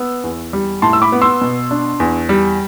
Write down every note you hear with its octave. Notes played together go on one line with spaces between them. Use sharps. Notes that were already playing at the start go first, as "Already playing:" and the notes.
Already playing: B3 E6
E2
G3
A2 A5 C6
E6
B5 D6
B3
C6 E6
B2
D4
E2
G3